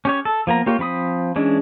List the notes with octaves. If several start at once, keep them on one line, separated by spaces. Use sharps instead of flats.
C#4 G4 C#5
A4
F3 A#3 B3 A#5
A#3 F4 G4 C#5
F3 C4 B5 D#6
E3 G#3 C#4 D4